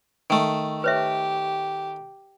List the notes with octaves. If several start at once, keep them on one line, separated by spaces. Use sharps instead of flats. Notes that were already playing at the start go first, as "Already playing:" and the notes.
D#3 A3
G4 B4 C#5 E5